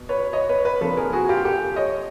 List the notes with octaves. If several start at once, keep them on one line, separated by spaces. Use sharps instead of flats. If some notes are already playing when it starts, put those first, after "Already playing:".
Already playing: B2
B4 C#5
C#5 D#5
B4 C#5
B4 C#5
C3 F3 A#3 D4 A4 B4
G#4 A#4
F#4 G#4
F4 G4
G4 A4
C#5 D#5